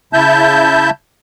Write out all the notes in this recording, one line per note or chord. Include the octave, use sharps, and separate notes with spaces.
C#3 E4 E5 A5 G6